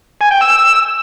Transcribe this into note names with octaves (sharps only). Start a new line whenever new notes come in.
G#5
G5
E6